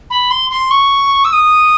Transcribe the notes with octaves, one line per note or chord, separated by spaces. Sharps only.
B5
C6
C6
C#6
E6
D#6